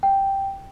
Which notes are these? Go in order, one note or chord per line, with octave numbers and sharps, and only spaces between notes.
G5